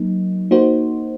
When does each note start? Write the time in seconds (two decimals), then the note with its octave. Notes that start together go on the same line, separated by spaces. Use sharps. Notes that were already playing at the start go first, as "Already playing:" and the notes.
Already playing: F#3 A#3 D#4
0.51 A#3 D#4 F#4 C5